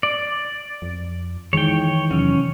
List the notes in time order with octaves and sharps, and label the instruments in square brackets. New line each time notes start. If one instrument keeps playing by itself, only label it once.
[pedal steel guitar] D5
[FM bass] F2
[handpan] D#3 E3 [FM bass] G#3 [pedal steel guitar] C#5 G5
[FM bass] E2 [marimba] C3 F#3 [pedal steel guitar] C#4